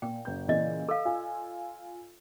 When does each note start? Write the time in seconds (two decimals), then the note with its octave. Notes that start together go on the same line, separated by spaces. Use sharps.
0.02 A#2 G5
0.25 F#1 G6
0.48 A#2 C#3 E3 D5 D#5
0.89 A4 F5 E6
1.05 F4 G#5